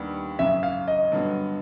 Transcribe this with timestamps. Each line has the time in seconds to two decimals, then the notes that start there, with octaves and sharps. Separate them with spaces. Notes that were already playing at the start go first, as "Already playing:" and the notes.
Already playing: D#2 D#3 G3 B3 D4
0.39 G#1 F#2 C#3 E5
0.63 F5
0.88 D#5
1.12 G2 D3 F#3 B3